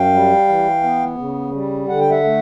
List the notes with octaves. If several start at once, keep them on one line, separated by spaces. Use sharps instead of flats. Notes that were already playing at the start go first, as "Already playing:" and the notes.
Already playing: F#2 F5 G5
G3
E3
B3
C#3
G3
D3 F#5
G5
E5 F#5
A3